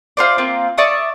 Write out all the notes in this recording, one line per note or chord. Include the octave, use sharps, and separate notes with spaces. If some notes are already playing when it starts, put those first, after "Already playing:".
F4 C5 D5
A#3 C4 F4
D5 E5 C#6 D#6